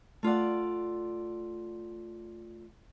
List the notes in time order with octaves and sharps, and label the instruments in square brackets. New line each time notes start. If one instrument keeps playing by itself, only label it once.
[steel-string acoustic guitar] A3 F4 D5 F#5